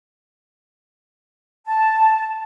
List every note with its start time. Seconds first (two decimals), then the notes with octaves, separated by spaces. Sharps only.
1.66 A5